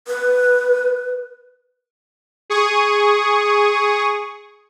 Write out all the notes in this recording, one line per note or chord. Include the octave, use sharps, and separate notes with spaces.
B4
G#4 C#6 D#6